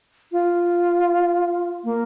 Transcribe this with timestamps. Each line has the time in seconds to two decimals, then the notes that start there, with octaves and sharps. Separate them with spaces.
0.32 F4
1.84 A#3